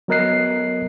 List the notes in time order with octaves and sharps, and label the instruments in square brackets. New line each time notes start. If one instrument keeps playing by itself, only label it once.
[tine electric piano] F#3 B3 A#4 D#5 F#6 C7